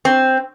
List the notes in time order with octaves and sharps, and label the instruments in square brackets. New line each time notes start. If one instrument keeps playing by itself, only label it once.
[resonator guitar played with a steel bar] C4